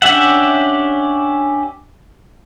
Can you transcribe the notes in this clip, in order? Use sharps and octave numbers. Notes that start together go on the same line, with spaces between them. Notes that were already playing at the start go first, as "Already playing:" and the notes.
C#4 D4 G4 E5 F#5